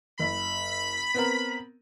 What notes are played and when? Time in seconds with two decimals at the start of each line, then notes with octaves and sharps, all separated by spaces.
0.19 F#1 B5
1.15 B3 C4 A#4